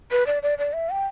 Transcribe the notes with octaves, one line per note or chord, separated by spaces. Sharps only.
B4
D5
D5
D5
E5
G5